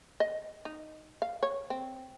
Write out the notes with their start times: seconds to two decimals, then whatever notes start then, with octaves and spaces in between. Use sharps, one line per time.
0.20 D#5
0.65 D#4
1.22 F5
1.43 C#5
1.70 C4